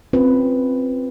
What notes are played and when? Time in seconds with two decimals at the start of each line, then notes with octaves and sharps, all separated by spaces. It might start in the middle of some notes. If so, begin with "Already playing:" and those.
0.13 C4 C#4 F4 B4 C5